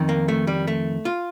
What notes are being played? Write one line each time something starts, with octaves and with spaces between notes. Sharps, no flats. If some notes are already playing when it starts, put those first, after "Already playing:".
Already playing: F2 D#3
A#3
A3
G3
A3
F4